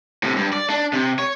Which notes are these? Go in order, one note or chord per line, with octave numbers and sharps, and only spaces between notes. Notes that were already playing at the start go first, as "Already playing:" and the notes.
A2 C3
G2
D5
D4
C3
C#5